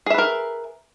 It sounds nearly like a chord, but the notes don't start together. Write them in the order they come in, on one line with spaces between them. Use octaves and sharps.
G#4 E5 B4 A#4